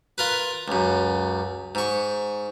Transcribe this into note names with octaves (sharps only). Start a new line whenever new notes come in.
F4 A#4 B4
C#2 F#2
G#2 C#6